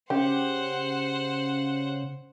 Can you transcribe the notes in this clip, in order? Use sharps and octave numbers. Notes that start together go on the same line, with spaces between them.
C#3 G4 C5 F#5